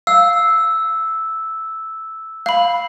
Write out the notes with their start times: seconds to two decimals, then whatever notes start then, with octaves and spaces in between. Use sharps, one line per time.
0.07 F5 E6
2.46 F5 B5